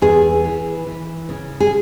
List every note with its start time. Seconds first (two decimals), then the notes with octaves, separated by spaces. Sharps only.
0.02 E2 G#4
0.44 E3
0.87 E3
1.29 C#3
1.60 G#4